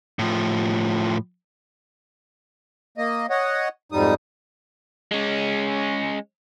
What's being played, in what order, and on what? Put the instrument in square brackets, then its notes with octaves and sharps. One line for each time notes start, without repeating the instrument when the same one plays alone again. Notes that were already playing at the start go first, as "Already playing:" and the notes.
[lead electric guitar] A2 F3
[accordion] A#3 D#5
C#5 D#5 F#5
F2 G#2 G3 D#4 D#6
[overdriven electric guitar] G#3 C#4